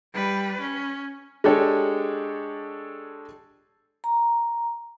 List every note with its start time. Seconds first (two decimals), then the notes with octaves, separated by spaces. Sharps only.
0.14 G3 B4
0.61 C#4
1.44 G#3 D4 G4 A4 C#5
4.04 A#5